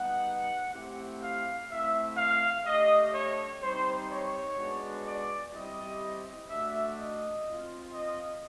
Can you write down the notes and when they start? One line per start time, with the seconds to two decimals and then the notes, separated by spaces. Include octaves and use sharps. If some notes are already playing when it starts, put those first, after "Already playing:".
Already playing: G3 B3 D#4 F#5
0.72 A3 C4 E4 G4
1.21 F5
1.70 A3 C4 E4 E5
2.17 F5
2.64 A3 D4 G4 D#5
3.12 C#5
3.60 G3 C4 D#4 C5
4.09 C#5
4.56 G#3 B3 D4 F#4
5.05 D5
5.52 G3 C4 E4 G4 D#5
6.49 A3 D4 F#4 E5
6.97 D#5
7.45 C4 F4
7.92 D#5